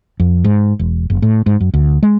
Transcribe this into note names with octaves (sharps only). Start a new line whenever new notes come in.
F2
G#2
E1
F#1
A2
G#2
F#2
D2
G#3